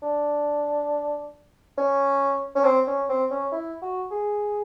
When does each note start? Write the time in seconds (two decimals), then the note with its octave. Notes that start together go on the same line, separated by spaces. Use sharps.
0.02 D4
1.78 C#4
2.55 C#4
2.64 C4
2.87 C#4
3.09 C4
3.31 C#4
3.52 E4
3.82 F#4
4.11 G#4